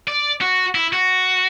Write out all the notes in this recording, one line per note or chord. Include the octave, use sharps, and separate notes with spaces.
D5
F#4
E4
F#4